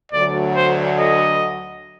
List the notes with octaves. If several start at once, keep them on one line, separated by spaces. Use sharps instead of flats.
D2 D3 F#3 D5
C5
D#5